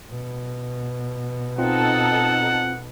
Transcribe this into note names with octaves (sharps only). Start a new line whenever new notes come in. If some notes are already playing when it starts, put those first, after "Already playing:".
B2
C4 D#4 F4 A4 F#5